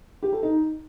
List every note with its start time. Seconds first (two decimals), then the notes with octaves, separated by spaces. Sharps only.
0.23 G4
0.33 A4
0.43 D#4